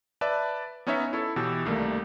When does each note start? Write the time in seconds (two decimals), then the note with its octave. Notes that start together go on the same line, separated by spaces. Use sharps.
0.21 B4 D5 E5 A5
0.87 B3 C#4 D#4 C#5 E5
1.13 E4 A4 C#5
1.36 B2 E3 G4 E6
1.65 C2 D#3 G3 A3 A#3